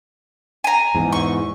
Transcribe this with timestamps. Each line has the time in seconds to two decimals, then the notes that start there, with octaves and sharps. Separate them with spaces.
0.64 G#5 A#5
0.95 E2 G#2
1.12 C#6